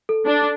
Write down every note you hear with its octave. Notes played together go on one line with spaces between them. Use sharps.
A4
D4